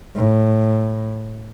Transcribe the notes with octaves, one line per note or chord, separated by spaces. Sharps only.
A2